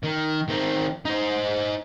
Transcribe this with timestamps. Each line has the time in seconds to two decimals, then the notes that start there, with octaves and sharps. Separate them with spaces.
0.04 D#3
0.49 D#3 C4
1.05 D#4 C5